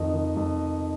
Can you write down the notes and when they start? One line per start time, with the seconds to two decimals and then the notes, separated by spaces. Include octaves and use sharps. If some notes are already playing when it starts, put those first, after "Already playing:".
Already playing: F2 D#3 D#5
0.13 D#3
0.36 F2